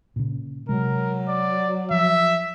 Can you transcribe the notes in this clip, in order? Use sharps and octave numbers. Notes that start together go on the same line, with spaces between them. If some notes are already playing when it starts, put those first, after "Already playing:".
A#2 C#3
C3 F#3 G#3 A#4
D5
F3 E5